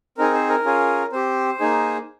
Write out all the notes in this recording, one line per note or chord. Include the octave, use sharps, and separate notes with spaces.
C4 D#4 G#4 A#4
C5
A#4
C#4 F4 G#4
C4 G4 C5
A#3 D#4 G#4